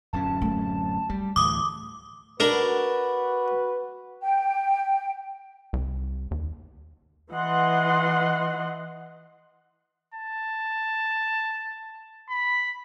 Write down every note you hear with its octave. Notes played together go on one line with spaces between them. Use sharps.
D1 F#2 C#4 A5
A3 C4
G3 A3
D2 A2 E3 D6 D#6
D4 F#4 A#4 B4
G5
C2
D#2
E3 D#5 F#5 C6
A5
B5